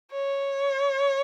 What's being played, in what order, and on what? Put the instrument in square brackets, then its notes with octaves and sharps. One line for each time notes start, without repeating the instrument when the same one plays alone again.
[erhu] C#5